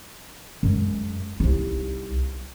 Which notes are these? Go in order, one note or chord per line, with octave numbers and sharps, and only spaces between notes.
F#2 G#3
C2 D#4